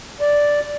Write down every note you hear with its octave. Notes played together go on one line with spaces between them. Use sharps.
D5